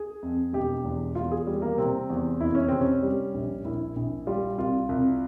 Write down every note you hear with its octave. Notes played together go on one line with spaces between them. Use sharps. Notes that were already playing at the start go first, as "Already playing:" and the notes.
Already playing: G#4
F2
E1 G4
E2
E2 F4
G#4
G3
A#3
C3 C4
E2
F1 E4
C#4
C3 C4
C#4
G3
A#1
A#1 E4
A#1
G3 F4
C2 F4
C2